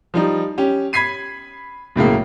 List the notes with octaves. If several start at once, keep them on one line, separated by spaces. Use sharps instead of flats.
F3 G3 D#4
C#4 G4
B5 G#6 B6 C7 D#7
B1 A2 C#3 A#3